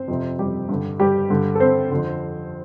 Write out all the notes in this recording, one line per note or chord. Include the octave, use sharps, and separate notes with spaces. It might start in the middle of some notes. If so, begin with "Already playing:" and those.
Already playing: C4 C5
F2 C3
G3 G4
G2 D3
G3 G4
G2 D3
A4
C4 C5
F2 D3